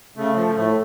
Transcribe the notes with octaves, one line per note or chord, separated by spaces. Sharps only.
C#3 A3
F3
A2 A3